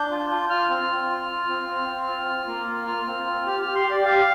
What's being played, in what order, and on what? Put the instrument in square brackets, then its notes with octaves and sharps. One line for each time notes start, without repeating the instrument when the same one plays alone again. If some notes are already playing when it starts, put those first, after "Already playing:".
Already playing: [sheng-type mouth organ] D4 G6
F4
F4
F4 F6
C4
F4
F4
F4
C4
C4
C4
F4
F4
A#3
F4
F4 F6
C4
F4
G4 F6
G4 F6
C6
G4 D5
G4 F5